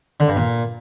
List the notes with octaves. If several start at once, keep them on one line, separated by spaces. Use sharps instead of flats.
D3
G2
A#2